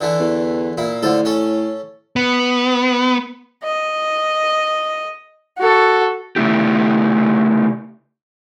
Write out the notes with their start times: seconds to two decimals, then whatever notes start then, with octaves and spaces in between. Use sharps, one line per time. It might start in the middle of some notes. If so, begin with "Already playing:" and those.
0.01 D3 E3 A3
0.20 E2
0.77 A#2 E4
1.03 A2 D3 F3 A4
1.25 C#4 A4
2.16 B3
3.64 D#5
5.58 F#4 A4
6.36 C#3 A3 E4 G4